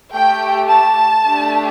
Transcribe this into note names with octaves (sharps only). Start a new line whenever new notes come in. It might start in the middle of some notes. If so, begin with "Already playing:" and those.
A3 G4 G5
A5
A3 D4 G4